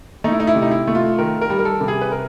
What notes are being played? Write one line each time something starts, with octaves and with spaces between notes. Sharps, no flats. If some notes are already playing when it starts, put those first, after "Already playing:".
A3 D#4
E4
D#4
E4
C3
D#4
E4
A3
F4
D#3 A#4
A#4
G3
A#4
A4
C3
G#4
B4
A#4